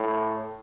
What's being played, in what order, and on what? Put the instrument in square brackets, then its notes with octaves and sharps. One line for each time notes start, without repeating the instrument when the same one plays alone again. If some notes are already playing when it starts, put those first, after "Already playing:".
Already playing: [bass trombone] A2